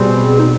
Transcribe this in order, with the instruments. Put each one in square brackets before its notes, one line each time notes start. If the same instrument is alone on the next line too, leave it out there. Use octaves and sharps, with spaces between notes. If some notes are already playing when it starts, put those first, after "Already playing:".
Already playing: [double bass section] B2 G3 C4 [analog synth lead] G#4
[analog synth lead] D#4